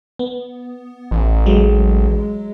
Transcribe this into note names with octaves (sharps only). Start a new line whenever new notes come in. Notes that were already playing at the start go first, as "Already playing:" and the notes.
B3
A1
F#3 G#3